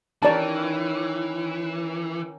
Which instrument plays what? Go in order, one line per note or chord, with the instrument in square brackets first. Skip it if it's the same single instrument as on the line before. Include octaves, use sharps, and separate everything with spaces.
[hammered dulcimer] D#3 C#4 A#4 [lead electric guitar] E3 [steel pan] D5 A5